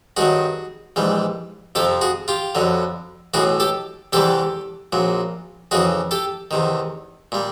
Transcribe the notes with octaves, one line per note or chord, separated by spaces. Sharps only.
G2 D#3 F#3 F#4 G#4
A#1 G#2 E3 G3
F2 C3 F3 G4 A4
F#4 G#4
F4 G4
F2 D3 F#3
B1 A2 E3 F#4 G#4
G4 A4
E2 C3 E3 G3 G4 A4
A#1 A#2 F#3
F2 C#3 E3 F#4 G#4
G4 A4
E2 C3 D#3
A#2 G3